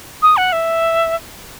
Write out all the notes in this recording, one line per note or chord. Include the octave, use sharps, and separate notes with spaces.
D#6
F#5
E5